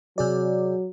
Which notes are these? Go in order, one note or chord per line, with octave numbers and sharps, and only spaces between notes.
C3 F#3 G#4 D5